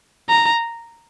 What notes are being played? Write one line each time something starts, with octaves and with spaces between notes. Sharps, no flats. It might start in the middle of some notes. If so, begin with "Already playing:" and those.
A#5